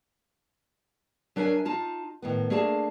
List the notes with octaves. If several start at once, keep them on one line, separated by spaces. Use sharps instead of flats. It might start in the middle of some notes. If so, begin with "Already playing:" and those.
F#3 D4 A#4 E5 G5 G#5
D#4 F4 A5
A2 D#3 B3
A3 A#3 D4 G#4 F5 A5